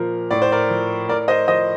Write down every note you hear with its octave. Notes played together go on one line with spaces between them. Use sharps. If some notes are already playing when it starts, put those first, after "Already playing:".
Already playing: A#2 F3 A#4
A2 D5
C5
A#4 D5
F3
A2 A#4 D5
C5 D#5
F3 C5 D#5